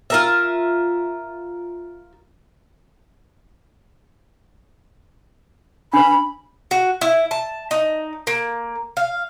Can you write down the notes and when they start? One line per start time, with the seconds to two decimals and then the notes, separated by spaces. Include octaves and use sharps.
0.10 F4 A#4 E5
5.93 D4 B4 B5
6.71 F#4
7.01 E4
7.31 A5
7.71 D#4
8.27 A#3
8.97 F5